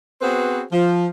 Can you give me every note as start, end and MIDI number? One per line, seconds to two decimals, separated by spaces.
0.22 0.62 59
0.22 0.62 60
0.22 0.62 66
0.22 0.62 68
0.22 0.62 71
0.22 0.62 72
0.72 1.07 53